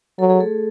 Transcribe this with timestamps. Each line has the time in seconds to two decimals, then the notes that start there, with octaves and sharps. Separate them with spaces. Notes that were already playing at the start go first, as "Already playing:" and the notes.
0.19 F#3 A4
0.30 G#4
0.40 A3 A4